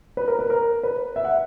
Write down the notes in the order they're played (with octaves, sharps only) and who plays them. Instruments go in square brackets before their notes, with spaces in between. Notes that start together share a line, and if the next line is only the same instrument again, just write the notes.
[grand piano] B4
A#4
B4
A#4
B4
E5
F#5